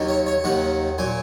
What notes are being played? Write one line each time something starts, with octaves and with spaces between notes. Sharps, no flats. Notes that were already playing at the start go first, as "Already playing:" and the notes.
Already playing: D#2 D#3 F#3
C#5
C#5
D#2 D#3 F#3 F#5
A#2 F#3 G#5